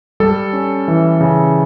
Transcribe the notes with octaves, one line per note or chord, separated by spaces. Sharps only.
G3 A4
C#4
E3
C#3